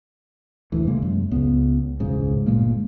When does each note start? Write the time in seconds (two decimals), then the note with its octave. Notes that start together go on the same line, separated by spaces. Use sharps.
0.72 F#1 D2 E3
0.87 C3 G#3 A#3
1.02 F#2
1.31 C#2 C#3 B3
2.00 E1 C#2 G#2 C#3
2.46 G1 A#2 G#3 A#3